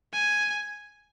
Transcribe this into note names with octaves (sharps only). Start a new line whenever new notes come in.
G#5